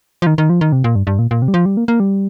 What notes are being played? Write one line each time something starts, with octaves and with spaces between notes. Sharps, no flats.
F3
D#3
D#3
F3
D#3
C3
A#2
G2
G2
A#2
A#2
C3
G3
F3
G3
A#3
A#3
G3